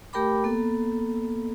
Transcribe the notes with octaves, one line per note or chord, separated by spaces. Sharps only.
A3 G4 A#4 G5 B5 D6
A#3 B3 A4